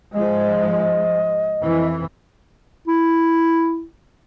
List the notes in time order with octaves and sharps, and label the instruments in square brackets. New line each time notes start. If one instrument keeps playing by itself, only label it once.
[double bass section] G#2 F3 G#3 [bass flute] D#5
[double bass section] F2 E3
[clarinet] E4